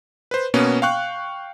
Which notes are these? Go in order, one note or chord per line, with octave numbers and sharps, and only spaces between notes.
B4 C5
B2 A#3 B3 C#4
F5 G5 C#6 F#6